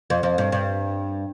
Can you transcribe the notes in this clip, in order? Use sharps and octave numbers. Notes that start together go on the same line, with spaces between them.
F2
F2
G2
G2